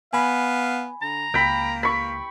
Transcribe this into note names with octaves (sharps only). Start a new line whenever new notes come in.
B3 F5 G#5 B5
D3 A#5
C#2 A#3 G5 B5
B5 C#6